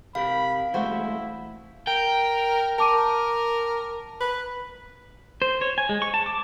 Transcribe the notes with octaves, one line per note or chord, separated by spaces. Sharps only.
C3 G4 A#4 F5 B5
E3 G#3 A3 E4 F#4 C5 B5
A#4 G5
A#4 A5 D6 D#7
B4
C5
C#5
G#5
G#3
C#6
A5
D6